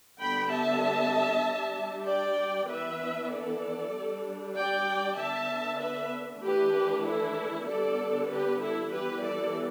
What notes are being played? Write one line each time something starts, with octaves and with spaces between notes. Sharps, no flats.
D3 G3 B3 D4 G5 B5
E5 A5
G3 D4
D5 G5
E3 B3 D4 B4 E5
A4 D5
G3 D4
D5 G5
D3 B3 D4 E5 A5
B4 E5
E3 A3 D4 G4 B4
E4 A4
D3 G3 B3 D4 A4 D5
G4 B4
E4 A4
E3 G3 B3 G4 B4
A4 D5